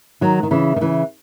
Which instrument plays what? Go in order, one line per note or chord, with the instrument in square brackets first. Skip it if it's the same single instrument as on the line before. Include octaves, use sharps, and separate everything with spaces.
[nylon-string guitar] D#3 F#3
D#3
C#3 E3
D#3
C#3 E3